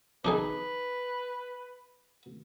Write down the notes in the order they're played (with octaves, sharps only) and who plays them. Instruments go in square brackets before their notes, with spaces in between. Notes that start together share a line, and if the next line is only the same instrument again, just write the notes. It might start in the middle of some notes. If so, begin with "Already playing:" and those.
[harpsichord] D4 D#4 G#4 [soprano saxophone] B4